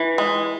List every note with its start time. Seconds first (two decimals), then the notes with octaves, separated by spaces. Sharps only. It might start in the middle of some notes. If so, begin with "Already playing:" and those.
Already playing: E3
0.18 G#3